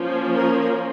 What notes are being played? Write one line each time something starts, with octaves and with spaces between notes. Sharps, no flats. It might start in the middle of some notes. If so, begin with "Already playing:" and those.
Already playing: F3 A#3 C#4
A#4